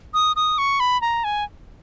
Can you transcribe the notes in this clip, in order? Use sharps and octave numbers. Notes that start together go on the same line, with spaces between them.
D#6
D#6
C#6
B5
A#5
G#5